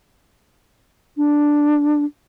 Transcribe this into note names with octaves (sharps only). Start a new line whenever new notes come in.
D4